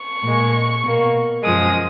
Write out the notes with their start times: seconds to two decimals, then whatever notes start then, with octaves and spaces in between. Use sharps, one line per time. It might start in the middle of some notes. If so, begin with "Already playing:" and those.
Already playing: C#6
0.22 A#2 G#3
0.82 B2 A#3
1.43 F#2 F3 G#3 D#6